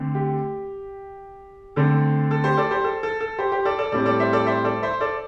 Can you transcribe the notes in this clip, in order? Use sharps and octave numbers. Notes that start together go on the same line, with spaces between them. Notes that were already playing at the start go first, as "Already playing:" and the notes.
Already playing: D3 A3 C4
G4
D3 A3 C4 A4
A4
G4 C5
A4 D5
G4 C5
A4
A4
A4
G4 C5
G4 C5
A4 D5
A4 D5
A2 G3 C4 A4 D5
A4 D5
C5 E5
A4 D5
C5 E5
A4 D5
C5 E5
A4 D5